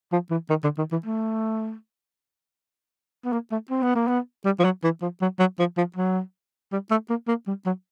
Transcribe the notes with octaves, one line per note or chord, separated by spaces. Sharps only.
F3
E3
D#3
D3
D#3
E3
A3
B3
A#3
A3
C4
B3
A#3
B3
G3
F3
F#3
E3
F3
F#3
F#3
F3
F3
F#3
G3
A3
A#3
A#3
G3
F#3